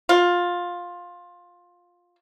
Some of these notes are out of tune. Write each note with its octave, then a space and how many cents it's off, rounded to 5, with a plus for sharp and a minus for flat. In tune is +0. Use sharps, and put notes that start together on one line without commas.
F4 +15